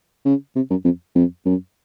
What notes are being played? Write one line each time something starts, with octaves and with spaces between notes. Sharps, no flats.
C#3
C3
F#2
F2
F2
F#2